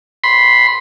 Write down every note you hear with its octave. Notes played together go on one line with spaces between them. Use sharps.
B5 C6